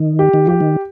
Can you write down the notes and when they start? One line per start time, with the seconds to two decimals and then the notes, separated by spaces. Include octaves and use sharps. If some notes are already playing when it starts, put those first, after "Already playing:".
Already playing: D#3
0.19 G4
0.34 D#3
0.47 F3 G4
0.61 D#3